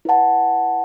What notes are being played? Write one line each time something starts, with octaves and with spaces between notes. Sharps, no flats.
E4 B4 F#5 A5